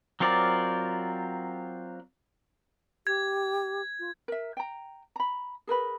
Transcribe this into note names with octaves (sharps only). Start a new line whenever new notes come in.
F#3 C4 F4 A#4 D5
G4 G#6
F4
A#4 E5
G5 A#5
A#5 B5
G#4 A#4 B4 B5